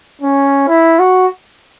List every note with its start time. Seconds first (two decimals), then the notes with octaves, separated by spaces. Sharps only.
0.21 C#4
0.68 E4
0.99 F#4